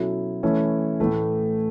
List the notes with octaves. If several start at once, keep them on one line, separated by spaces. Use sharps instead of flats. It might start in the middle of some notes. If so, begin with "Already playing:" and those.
Already playing: B2 F#3 C#4 E4 A4
E3 A3 C#4 E4
A2 E3 A3